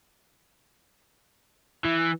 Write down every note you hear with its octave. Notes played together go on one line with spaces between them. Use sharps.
E3